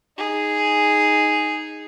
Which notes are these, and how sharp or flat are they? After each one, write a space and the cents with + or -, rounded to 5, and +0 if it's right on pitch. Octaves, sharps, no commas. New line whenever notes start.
D#4 +0 G#4 -5